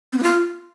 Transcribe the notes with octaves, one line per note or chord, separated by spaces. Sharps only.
C4
B3
F4